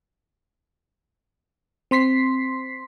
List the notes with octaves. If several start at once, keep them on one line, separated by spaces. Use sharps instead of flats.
C4 C6 B6 C7